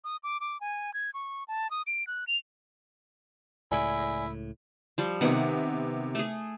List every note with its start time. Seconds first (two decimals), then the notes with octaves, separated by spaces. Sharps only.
0.04 D#6
0.23 D6
0.40 D6
0.61 G#5
0.94 G#6
1.14 C#6
1.48 A5
1.71 D#6
1.87 D7
2.07 F#6
2.27 F7
3.72 C#2 A2 E4 D5 G#5
4.98 F3 G3
5.21 C3 D#3 B3 F#5 G#5
6.15 A3 G#4